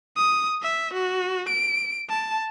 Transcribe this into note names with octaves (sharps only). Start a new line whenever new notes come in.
D#6
E5
F#4
D7
A5